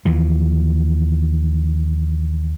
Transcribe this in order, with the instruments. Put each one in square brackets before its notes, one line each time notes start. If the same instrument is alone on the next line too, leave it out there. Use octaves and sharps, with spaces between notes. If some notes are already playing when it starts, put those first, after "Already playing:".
[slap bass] D#2 E3 F3